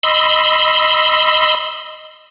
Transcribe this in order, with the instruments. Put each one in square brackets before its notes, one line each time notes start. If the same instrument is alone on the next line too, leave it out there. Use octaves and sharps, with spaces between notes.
[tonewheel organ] D#5 B5 C6 E6